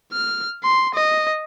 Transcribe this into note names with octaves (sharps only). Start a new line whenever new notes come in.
F6
C6
D#5